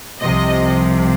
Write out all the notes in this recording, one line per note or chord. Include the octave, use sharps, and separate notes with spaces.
C2 C3 F3 D#5